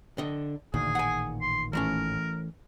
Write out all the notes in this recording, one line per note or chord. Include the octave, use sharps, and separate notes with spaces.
D3 D#5
A1 D2 A#2 D#3 G#4
F#5 G#5
C6
E3 A3 C#4 A#4